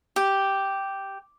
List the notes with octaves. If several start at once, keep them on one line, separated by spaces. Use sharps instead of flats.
G4